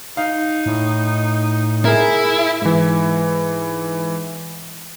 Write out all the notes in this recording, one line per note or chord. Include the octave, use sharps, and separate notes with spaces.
D#4 F5
A2
E4 G#4 A#4
G#2 E3